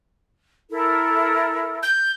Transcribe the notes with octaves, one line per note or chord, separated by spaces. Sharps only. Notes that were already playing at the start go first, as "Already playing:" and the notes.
E4 A4 A#4
G6